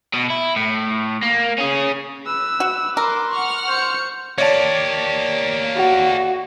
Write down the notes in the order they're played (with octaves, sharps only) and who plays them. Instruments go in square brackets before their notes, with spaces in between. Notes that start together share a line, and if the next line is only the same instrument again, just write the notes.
[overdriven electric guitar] B2
E4
A2
A#3
C#4 G#4
[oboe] B4 [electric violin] E6
[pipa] F#4
[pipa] A#4 [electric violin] C6 D6
[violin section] F#5 F6 [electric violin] C#6
[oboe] C5 [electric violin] C#6 C#7
[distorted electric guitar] A#3 G4 [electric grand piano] C#5 D5 A5
[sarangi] F#4